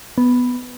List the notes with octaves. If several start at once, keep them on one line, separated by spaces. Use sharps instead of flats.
B3